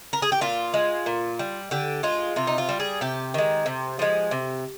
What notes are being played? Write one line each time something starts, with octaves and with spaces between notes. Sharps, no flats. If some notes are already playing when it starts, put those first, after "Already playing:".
A#4
G#4
G4
A#2 F4
G#3
A#2
G3
D3 G4
G#3 F4
C3 F4
D#4
F4
G3
G#4
C3 G4
D#3 G#3
C3
F3 G#3
C3